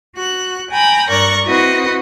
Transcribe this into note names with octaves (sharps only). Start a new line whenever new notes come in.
F#4 F#6
G5 G#5 A#5 B5
G2 A#4 D5 A#5 C#6 F#6
C4 E4 F#4 B4 D#5